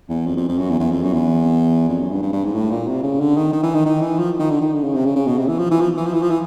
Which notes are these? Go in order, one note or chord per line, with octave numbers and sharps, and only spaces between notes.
E2
F2
F2
F2
F#2
E2
E2
F2
F#2
E2
F2
F#2
G2
G2
G2
G#2
A2
A#2
C3
C#3
D3
D#3
D#3
E3
D#3
D#3
E3
F3
D#3
D3
D#3
D3
C#3
C3
C#3
C#3
B2
C3
E3
F3
E3
F3
E3
F3
E3
F3
E3